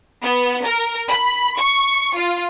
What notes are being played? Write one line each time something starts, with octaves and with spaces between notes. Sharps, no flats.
B3
A#4
B5
C#6
F4